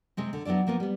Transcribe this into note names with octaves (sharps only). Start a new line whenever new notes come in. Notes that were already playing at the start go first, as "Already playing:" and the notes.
C3 G#3 C4
D3
F#3 B3 D4 E4 D5
F3 A#3 B3 F4
G3 B3